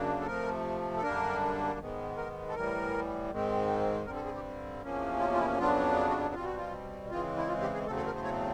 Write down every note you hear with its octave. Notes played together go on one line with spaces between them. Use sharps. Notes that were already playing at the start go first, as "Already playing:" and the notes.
Already playing: F#2 C#3 F#3 A#3 D4
A4
C3 F3 A3 A#4
A4
F#2 D3 G3 A#3 D4 A#4
G#2 D#3 G#3 B3
A#4
A4
A2 E3 G3 A#4
G#2 D#3 G#3 C4
G2 D3 G3 C4 A#4
A4
G#4
G4
E2 C3 F3 A#3 C#4
F4
F4
E4
F2 C#3 F#3 B3 D4 F4
F#4
B2 G3 C4 F4
F#4
F4
C#3 E3 G#3 C4 F4
E4
F4
G4
G#4
E2 C#3 F#3 A3 C4 A4
A4
A#4
C5
C#5